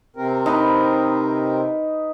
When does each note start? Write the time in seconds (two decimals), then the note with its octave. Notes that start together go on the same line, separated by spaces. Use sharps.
0.16 C3 C4 A#4
0.46 D#4 B4